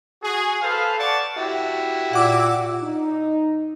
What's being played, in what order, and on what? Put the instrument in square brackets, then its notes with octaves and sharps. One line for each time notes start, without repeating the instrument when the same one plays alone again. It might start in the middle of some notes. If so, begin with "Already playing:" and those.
[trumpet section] F#4 G#4
A4 B4 C5 F5
D5 F#5 A5 C#6 D6
[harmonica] E4 F#4 G4
[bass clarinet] A#2 [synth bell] F#5 D6 E6
[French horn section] D#4